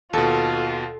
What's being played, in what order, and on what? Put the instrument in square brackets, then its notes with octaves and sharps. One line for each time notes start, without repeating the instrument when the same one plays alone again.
[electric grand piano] D#2 B2 [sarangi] F4 [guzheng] A4